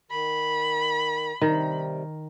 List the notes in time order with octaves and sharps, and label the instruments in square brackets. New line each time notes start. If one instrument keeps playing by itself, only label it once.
[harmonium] D#3 [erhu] B5
[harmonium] C3 G3 [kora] D#3